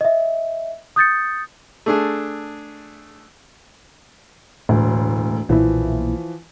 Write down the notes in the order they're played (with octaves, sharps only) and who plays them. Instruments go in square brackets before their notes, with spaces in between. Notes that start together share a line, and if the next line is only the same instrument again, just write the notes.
[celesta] D#5 E5
D#6 G6 A6 C#7
[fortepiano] A3 D4 G#4
[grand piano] E1 D2 [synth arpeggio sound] A2
[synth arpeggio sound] B1 A#2 E4 [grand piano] E3 F3